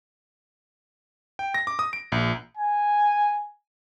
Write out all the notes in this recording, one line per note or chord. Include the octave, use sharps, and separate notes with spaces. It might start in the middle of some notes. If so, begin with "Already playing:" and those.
G5
A#6
D6
D#6
D7
A#1
G#5